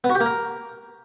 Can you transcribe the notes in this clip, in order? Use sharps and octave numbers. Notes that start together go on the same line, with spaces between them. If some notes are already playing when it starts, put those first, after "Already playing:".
B3
F#4
G4
A#3
A#4